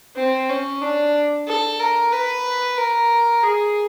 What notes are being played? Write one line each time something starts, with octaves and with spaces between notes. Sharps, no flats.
C4
C#4
D4
A4
A#4
B4
A#4
G#4